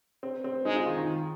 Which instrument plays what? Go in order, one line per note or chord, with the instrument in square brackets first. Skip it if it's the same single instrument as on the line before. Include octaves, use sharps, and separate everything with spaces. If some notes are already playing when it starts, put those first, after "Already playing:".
[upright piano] C4
C4
[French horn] G#3 [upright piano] D#4
[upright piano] F4
D#3
D#3